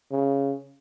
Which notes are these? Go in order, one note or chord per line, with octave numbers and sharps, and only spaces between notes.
C#3